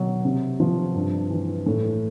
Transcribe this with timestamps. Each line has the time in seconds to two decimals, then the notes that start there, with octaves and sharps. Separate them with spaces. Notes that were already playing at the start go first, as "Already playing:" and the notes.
Already playing: B2 F#3
0.25 C3
0.60 F3
0.95 G2
1.30 E3
1.66 A2